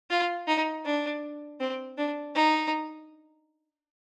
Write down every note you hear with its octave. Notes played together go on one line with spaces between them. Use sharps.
F4
D#4
D4
C4
D4
D#4